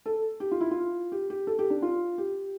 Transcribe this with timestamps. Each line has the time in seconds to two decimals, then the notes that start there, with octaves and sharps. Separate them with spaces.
0.06 A4
0.40 G4
0.51 F4
0.61 E4
0.71 F4
1.12 G4
1.30 G4
1.47 A4
1.59 G4
1.70 D4
1.82 F4
2.18 G4